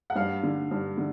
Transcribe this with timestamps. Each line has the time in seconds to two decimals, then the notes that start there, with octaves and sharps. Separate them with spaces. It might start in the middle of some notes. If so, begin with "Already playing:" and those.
0.10 F#5
0.15 G2 F5
0.43 D3
0.71 G2
0.97 D3